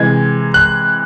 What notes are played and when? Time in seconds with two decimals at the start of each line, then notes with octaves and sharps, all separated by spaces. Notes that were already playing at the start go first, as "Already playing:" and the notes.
Already playing: C3 E3 G#3 G#6
0.54 F#6